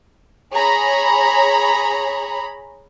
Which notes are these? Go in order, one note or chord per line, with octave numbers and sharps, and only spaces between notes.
G#4 C#5 A#5 B5